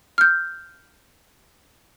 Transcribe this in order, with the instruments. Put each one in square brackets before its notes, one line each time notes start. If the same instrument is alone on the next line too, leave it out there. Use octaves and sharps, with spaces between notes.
[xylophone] F6 G6